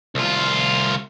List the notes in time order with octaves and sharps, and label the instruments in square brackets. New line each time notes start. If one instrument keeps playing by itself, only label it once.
[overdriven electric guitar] C2 F4